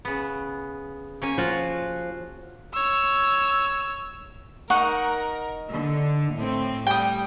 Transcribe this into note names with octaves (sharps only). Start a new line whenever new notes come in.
C#3 B3
A#3 C#4 G#5
F3 F4 F#4
C#5 E6
D#4 A#4 F#5 C#6
D3
A2 C4
G3 G5 D#6